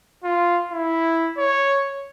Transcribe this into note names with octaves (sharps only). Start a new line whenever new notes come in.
F4
E4
C#5